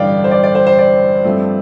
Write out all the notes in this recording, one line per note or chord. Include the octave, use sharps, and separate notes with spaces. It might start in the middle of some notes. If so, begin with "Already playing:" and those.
Already playing: A1 G2 D3 D5 F5 G5
C5
D5
D5
C5
C5
D5
G2 F3 A3 C4